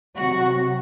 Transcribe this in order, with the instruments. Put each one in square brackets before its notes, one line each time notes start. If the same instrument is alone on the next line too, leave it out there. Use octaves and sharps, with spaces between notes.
[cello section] C3 F#3 F#4